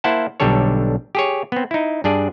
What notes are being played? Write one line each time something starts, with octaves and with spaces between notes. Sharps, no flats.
A#3 E4 C5 F#5 A5
B1 D3 G3 D4 A4 C#5
G4 G#4 C#5
B3 C4
D#4 E4
G2 D4 G#4 D5